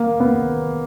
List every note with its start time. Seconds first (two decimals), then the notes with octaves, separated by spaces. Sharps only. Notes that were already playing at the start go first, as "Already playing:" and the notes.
Already playing: A#3
0.20 B3